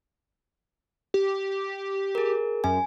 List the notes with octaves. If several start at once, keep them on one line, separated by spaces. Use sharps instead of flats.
G4
G#4 A#4
F#2 G#5